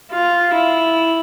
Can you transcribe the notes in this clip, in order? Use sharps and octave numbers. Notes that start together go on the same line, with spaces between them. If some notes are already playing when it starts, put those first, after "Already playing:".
F4
E4